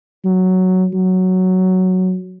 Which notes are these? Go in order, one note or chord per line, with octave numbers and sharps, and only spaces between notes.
F#3
F#3